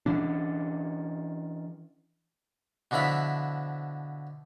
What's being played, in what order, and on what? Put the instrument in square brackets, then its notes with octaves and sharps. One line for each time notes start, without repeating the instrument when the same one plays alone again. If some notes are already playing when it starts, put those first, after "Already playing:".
[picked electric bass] E3 C#4 D4
[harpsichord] B2 D3 F3 E4 B5